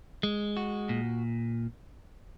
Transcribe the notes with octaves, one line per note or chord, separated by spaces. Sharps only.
G#3
F#4
A#2